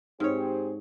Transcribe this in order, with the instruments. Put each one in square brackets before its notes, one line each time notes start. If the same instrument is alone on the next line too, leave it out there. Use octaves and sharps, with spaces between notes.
[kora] G#2 C#5 [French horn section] C4 G4 G#4